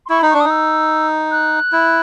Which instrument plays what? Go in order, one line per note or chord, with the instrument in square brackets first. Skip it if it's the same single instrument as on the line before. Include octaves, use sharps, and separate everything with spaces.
[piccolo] C6
[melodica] E4 [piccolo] C#6
[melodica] D#4 [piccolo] B5
[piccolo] C#6
[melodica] D4
[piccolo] D#6
[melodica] D#4
[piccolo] E6
F#6
[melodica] E4